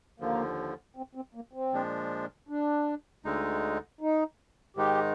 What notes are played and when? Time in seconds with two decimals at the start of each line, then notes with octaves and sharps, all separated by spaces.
0.20 D#2 D3 F3 A#3
0.97 C4
1.15 C4
1.35 A#3
1.53 C4
1.73 A#2 F3 G#3 D4
2.49 D4
3.24 D2 D3 G#3 D#4
4.01 D#4
4.76 G#2 D#3 G#3 D#4 G4